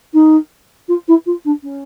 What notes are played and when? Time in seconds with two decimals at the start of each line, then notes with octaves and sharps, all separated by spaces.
0.13 D#4
0.88 F4
1.08 E4
1.26 F4
1.44 D4
1.63 C#4